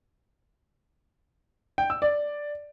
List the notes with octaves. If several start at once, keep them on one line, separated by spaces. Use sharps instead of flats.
G5
E6
D5